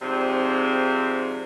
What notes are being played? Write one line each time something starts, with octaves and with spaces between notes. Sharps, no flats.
G#2 C3 F3 G3 C4